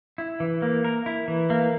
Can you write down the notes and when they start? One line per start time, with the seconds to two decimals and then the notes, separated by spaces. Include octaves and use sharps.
0.18 E4
0.40 E3
0.62 A#3
0.84 A#4
1.06 E4
1.28 E3
1.50 A#3